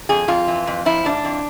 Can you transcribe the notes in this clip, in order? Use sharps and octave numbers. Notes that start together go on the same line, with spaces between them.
F2 G#4
F2 F4
E3
F2
F3 E4
G#2 D4
F2